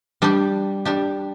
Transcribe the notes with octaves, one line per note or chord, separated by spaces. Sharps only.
G3 D4 G4
G3 D4 G4